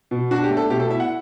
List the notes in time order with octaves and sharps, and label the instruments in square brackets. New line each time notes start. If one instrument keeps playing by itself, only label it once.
[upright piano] B2
D4 F#4
G4
A3
A4
B2 G4
A4
E4 E5
F#5